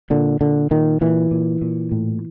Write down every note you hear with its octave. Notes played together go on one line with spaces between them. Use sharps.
A#2 D3
A#2 D3
A#2 D#3
A#2 E3
A#2
A#2
A2